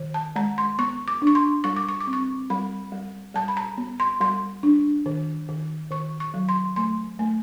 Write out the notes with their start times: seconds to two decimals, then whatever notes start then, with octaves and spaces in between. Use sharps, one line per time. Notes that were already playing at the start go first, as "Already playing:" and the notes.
Already playing: D#3
0.14 A5
0.36 G#3 A#5
0.58 C6
0.78 B3 C#6
1.08 D6
1.22 D4
1.27 C#6
1.35 C6
1.64 G3 C#6
1.76 D6
1.89 C#6
2.00 D6
2.07 C4
2.13 C#6
2.50 G3 B5
2.92 G3
3.34 G3 A5
3.48 B5
3.57 A#5
3.77 B3
4.00 C6
4.21 G3 C6
4.63 D4
5.06 D#3
5.49 D#3
5.91 D#3 C#6
6.20 C#6
6.34 F#3
6.49 C6
6.76 A3 C6
7.19 A3